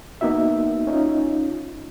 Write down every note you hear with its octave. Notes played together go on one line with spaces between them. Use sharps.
A#3 B3 D#4 F#4 E5
C#4 D#4 F4